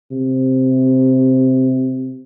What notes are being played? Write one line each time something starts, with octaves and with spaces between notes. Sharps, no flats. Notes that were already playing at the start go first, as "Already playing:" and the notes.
C3